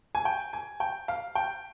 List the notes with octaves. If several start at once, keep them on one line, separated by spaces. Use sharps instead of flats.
G#5
G5
G#5
G5
F5
G5